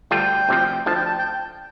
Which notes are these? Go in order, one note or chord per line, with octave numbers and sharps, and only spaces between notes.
D2 D3 G3 D4 F4 G5
D2 C3 F3 C4
D2 D3 F3 A5
G5
A5
G5